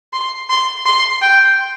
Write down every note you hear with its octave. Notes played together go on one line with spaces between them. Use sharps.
C6
C6
C6
G5